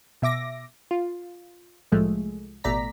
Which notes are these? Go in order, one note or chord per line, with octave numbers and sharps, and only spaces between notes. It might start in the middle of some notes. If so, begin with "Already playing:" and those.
B2 E5 D6 A#6
F4
C2 A2 F3 G#3 A3
A1 B2 A3 D5 A#5 B6